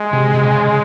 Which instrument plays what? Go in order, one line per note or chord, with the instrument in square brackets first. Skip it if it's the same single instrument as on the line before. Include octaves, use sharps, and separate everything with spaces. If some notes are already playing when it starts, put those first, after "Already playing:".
Already playing: [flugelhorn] G#3
[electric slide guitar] C3
C3
C#3